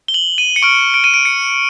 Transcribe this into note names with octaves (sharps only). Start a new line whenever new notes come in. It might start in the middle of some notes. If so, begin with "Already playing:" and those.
G7
F#7
D#7
C#7
C#6 F6 D7
D7
D#7
D7
C#7